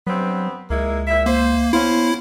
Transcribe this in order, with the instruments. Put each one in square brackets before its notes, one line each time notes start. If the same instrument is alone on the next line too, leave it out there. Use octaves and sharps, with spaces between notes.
[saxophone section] G2 B3 C4 [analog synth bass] F#3
[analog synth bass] C#2 [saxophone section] G#3 A#3 E4
[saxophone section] A#2 E5
[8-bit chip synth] A#3 [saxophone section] C5
[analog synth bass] B3 [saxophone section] C#4 C5 F5 [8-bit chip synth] E4